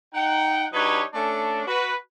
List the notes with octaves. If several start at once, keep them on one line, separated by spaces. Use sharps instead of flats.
D#4 F#5 G5
F#3 D4 D#4 G4 B4 C#5
A3 C#4 D4
F#4 B4